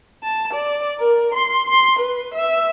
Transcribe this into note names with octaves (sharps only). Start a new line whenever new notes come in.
A5
D5
A#4
C6
C6
B4
E5